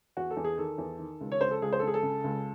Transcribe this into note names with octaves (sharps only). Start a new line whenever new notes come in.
E2 F#4
A4
E2
G#4
D#3 A4
E2
D#3
C#2
C#5
C#2 C5
A4
C#2 G#4
C5
A4
C#2 G#4
A4
C#3
C#2